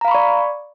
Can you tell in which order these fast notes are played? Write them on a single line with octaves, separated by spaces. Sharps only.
A#5 F5 B5 C#6 D5